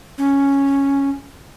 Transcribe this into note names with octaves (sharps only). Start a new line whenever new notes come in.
C#4